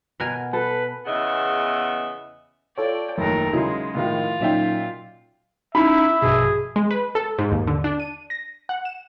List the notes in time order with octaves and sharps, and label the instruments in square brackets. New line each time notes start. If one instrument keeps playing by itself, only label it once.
[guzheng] B2 A#4 G#5
[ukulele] A4 [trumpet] B4
[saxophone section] E2 C#3 B3 D#5 E5
[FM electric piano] F4 A4 C#5 [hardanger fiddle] D5 G5
[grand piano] F#1 D#2 [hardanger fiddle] A3 A#4
[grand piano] C#3 F#3 D#4 [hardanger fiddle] G#3 [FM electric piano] E4 C6
[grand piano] A2 D#3 F3 [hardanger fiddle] F4
[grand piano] A#2 E5 G5 [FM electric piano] F#3 C#4 D#4
[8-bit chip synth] C#4 D#4 E4 [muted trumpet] E5 [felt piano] B5
[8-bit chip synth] A#1 G2 B2 [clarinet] G#4
[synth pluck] G#3
B4
A4
G#2
D#2
D3
D4
D#7
A#6
F#5
E7